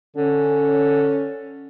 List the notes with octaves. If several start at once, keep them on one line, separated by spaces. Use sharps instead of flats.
D3 C#4